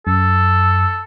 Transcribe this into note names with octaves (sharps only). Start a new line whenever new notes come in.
F#2 A4